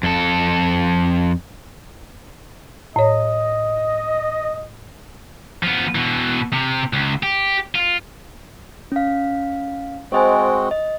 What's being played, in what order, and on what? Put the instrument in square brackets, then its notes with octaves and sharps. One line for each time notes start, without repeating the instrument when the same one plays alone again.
[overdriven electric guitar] F2 A4
[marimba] A2 C#5 [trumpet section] D#5
[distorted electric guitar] F3 B3
B2 E3
C3
C#2
G4
F4
[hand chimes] C#4 F5
[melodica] G#3 C4 F#4 [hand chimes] C5 D#5 G#5
[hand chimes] D#5